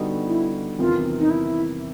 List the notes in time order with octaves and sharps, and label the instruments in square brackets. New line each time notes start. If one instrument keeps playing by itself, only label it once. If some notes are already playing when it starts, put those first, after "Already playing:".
Already playing: [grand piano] D3 G3 B3 D#4 F#4
[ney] E4
[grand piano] E2 C3 D#3 [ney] F4
[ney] D#4
E4